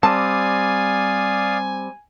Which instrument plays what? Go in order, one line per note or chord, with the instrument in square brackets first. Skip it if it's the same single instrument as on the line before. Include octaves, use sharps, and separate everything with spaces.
[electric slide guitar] G3 C4 [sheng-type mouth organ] D5 F5 D#6 [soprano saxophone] G#5 [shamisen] A5